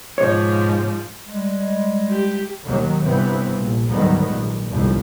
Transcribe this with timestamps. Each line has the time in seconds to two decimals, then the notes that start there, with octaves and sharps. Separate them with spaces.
0.18 G#2 B2 F3 C5 C#5
1.26 G3 G#3
2.10 G4
2.64 D#2 B2 D#3 F#3
3.03 G1 G2 C3 E3 B3 C4
3.56 A#1
3.89 D2 G#2 D#3 F#3 G3 B3
4.28 A#1
4.69 G1 C2 F2 G#2